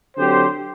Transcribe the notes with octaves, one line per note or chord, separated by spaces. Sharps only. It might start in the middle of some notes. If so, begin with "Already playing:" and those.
D3 F#3 C4 G4 C5